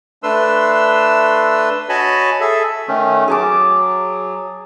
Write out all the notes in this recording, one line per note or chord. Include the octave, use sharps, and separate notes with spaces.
A3 D4 B4 C6 E6
F#4 C#5 D#5 G#5 A5 B5
G#4 A4 E5
D#3 A3 C#4
F#3 G#4 A5 D6